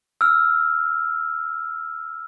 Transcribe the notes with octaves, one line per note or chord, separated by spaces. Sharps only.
E6 F6